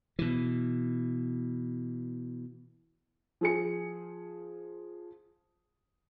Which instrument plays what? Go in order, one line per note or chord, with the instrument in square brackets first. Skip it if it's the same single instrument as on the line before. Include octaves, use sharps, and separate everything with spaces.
[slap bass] B2 E3
[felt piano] F3 G#4 C#7